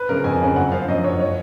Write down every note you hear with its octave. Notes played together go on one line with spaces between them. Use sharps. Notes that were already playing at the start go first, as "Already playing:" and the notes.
Already playing: B4
C#3 F3 A#4
F2 G#5
C#3 F3
F#2 F#5
F3 F5
F#2 D#5
F3 C#5
C#5